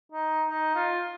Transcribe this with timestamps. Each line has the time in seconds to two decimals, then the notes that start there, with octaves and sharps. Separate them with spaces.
0.12 D#4
0.49 D#4
0.75 F4